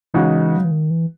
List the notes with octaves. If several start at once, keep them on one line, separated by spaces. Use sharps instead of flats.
C#3 E3 G#3 D#4 F#4
F#3
E3
D#3
E3